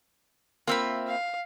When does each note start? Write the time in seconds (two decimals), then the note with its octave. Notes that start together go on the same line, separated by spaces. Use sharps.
0.67 A#3 C4 F4 E5 B5
1.08 F5